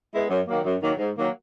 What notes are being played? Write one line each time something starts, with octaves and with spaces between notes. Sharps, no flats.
G#3 B3 E4
F#2
D#3 F#3 A#3
F#2
D#3 F#3 A#3
G#2
D#3 F#3 A#3